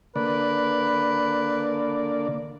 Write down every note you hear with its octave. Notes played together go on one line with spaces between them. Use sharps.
D3 A#3 B4 D5